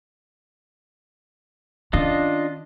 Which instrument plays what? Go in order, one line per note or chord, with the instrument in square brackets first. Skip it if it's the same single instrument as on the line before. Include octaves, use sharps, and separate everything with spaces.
[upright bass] D#3 C#4 [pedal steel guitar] D4 F4 D#5